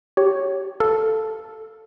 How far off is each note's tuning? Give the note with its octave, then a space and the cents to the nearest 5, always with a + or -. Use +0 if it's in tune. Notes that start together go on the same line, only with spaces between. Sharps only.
G4 -15 C#5 +0
A4 +0 F5 +0